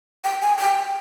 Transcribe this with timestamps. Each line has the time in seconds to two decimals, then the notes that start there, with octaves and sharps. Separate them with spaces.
0.24 G5
0.42 G#5
0.59 G5